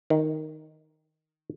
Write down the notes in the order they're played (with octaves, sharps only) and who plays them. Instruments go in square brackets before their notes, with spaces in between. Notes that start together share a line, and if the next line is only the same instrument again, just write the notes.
[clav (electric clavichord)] D#3